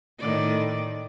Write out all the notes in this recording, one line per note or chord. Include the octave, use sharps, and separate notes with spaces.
A2 D#3 D5